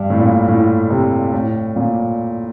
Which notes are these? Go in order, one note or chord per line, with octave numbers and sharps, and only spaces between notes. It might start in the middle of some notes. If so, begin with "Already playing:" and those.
Already playing: G2
A2
A#2
A2
C3
A2
A#2